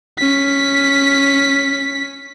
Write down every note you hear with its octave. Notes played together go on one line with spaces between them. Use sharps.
C#4 B6